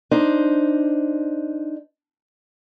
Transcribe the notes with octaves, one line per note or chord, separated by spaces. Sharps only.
D4 D#4 C5